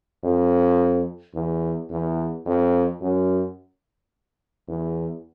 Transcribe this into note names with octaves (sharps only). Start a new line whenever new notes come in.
F2
E2
E2
F2
F#2
E2